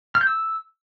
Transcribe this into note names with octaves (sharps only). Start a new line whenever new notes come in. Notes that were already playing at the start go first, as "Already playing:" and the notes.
F6
G6
E6